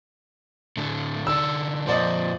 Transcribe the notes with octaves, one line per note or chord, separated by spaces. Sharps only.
A2 D3 A3
D3 D#4 D5 E6
F2 A#2 F3 C5 D5 D#5